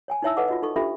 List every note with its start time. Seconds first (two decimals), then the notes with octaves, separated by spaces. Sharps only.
0.08 C#5 G5 G#5
0.22 D#4 E4 C#5 E5 A5 E6
0.37 A4 B4 C#5 D#5 F#5 D6
0.48 F4 F#4 D#5
0.63 D#4 A4 C#6
0.76 D4 F4 G4 A4 E5 B5